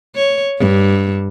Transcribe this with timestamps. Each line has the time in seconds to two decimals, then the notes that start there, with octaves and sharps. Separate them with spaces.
0.16 C#5
0.58 G2